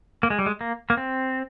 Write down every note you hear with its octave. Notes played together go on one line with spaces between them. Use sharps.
A#3
G#3
G3
G#3
A#3
A#3
C4